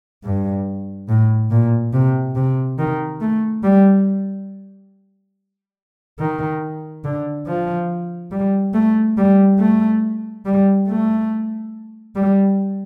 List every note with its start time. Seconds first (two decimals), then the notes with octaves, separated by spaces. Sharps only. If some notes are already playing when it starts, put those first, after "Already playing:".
0.24 G2
1.09 A2
1.51 A#2
1.93 C3
2.36 C3
2.79 D#3
3.21 A3
3.64 G3
6.20 D#3
7.04 D3
7.47 F3
8.32 G3
8.74 A3
9.17 G3
9.59 A3
10.45 G3
10.88 A3
12.16 G3